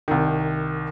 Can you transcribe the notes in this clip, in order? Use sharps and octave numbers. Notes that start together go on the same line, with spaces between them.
C2 D#3